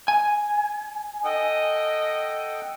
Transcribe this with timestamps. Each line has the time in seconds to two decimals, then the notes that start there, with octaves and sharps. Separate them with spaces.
0.08 G#5
1.25 A4 D#5 F#5 G5